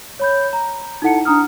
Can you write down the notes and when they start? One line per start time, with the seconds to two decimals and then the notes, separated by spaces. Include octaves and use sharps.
0.19 C#5 B5 G6
0.53 A#5
1.02 D#4 E4 A4 F#5 A5 C#7
1.25 D4 A#5 D#6 F6